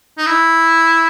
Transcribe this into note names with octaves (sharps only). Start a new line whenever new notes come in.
D#4
E4